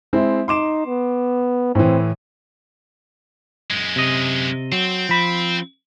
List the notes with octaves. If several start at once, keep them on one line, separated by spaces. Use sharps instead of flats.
G#3 C4 E4
D#4 C6 D6 E7
B3
A2 E3 C4
F#2 G#3
C3 D#5
F#3 C4
F3 B5